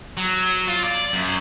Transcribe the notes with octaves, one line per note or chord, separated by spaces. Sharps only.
F#3
F4
D5
F#2